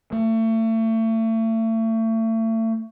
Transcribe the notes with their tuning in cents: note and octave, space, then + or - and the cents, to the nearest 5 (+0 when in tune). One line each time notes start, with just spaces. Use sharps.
A3 +35